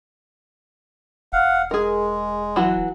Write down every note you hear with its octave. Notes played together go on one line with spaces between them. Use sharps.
E1 F5 F#5
G#3 G#4 A#4
E3 F#3 F#4